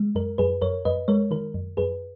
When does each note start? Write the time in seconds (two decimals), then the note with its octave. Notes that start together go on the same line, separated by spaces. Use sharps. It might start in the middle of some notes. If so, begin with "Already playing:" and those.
Already playing: G#3
0.15 F#2 A#4
0.38 F#2 G#4 B4
0.62 F#2 A#4 C#5
0.85 F#2 B4 D#5
1.08 G#3 A#4 C#5
1.31 D#3 A#4
1.54 F#2
1.77 F#2 G#4 B4